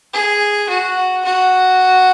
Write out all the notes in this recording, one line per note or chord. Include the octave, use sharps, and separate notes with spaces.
G#4
F#4
F#4